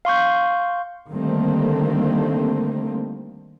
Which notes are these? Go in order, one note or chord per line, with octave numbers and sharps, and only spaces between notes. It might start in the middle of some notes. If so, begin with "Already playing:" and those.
F5 C6 C#6 G6
D3 D#3 G3 A3 A#3 C4